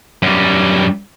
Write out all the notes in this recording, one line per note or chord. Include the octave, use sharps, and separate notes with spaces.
F#2 G3